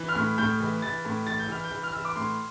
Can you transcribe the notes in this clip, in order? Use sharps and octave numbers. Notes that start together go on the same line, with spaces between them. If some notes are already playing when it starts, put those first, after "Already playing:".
Already playing: E3
F6
A2
A2 G6
E3
E3 A6
A2
E3 A6
G6
E3 F6
G6
E3
F6
E3 E6
D6
A2 C6